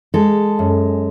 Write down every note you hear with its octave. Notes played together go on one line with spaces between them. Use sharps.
G#3 A4
F#2